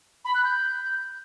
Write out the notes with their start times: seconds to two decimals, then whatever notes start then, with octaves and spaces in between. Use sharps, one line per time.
0.25 B5
0.35 F#6
0.44 G6